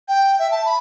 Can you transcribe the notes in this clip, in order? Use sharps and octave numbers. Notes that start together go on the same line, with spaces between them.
G5
E5
A5
B5